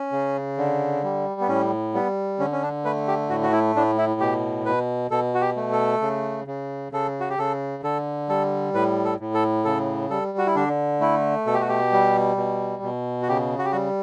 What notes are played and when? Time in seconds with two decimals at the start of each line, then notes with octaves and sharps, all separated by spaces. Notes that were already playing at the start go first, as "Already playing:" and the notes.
Already playing: C#4
0.12 C#3
0.57 D3
1.03 G3
1.41 B3
1.48 A2 C#4
1.94 G3 B3
2.39 D3 C#4
2.52 C#4
2.62 D4
2.85 A3 B4
3.08 G4
3.29 A2 F#4
3.43 F#4
3.53 E4
3.75 A2 D4
3.98 E4
4.20 B2 G4
4.66 B2 B4
5.11 B2 A4
5.35 F#4
5.41 G4
5.56 A3
5.72 A4
6.02 C#3
6.47 C#3
6.92 C#3 A4
7.20 F#4
7.30 G4
7.39 C#3 A4
7.83 D3 A4
8.29 G3 A4
8.74 A2 B4
9.05 A4
9.20 A2
9.34 A4
9.65 C#3 A4
10.10 G3 A4
10.38 F#4
10.46 E4
10.55 D3 D4
11.01 A3 E4
11.46 B2 A4
11.54 G4
11.61 F#4
11.69 G4
11.92 G3
12.37 B2
12.83 B2
13.22 F#4
13.28 C#3 G4
13.59 F#4
13.65 G4
13.72 G3 F#4